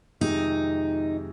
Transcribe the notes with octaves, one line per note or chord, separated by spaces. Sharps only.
F2 C3 D#3 G#3 D#4